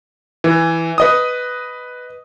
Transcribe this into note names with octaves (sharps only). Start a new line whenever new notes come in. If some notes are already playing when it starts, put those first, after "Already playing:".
E3
B4 D#5 D#6